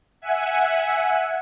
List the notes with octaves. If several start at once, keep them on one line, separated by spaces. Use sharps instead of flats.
E5 F#5 G#5